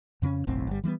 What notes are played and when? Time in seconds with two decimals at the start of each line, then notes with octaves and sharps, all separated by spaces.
0.22 F2 C#3 A#3 C#4
0.47 F#1 B1 A2 C4
0.67 G1 G3
0.84 E3 G3 A#3 B3